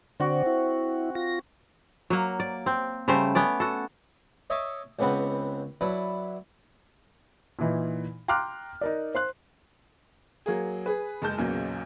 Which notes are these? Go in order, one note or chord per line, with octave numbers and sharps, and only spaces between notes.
D3 C4 F#4 D5
E4
F4 A#6
F#3 A#3
D5
C4
C#3 G3 A3 C5
B3 C#4 D5
F#4 A4
C#5 D#5 E5 C#6 D6
C#2 C#3 B3 C4 B4 F#5
F#3 D4 E4 B4
A#2 E3 D#4
G5 A#5 C6 D6 F6 F#6
D#4 A#4 D5
C5 C6 F#6
F#3 A#3 G#4
G#4 B4
F#1 G#3 A5 G6
B1 E2 A#2 C#3 F#3